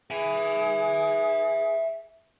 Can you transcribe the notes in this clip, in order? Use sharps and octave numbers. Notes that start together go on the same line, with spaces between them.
G#4 E5 G#5